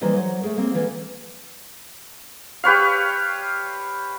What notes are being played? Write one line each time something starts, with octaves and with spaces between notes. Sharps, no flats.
E3 F3 G3 A#3 D#4 G4
F#3 F#4 C5 F#5
A3 G#4 A#4
A#3 C4 G#4
D3 E3 F3 A#3 B3
G4 B4 C#5 F5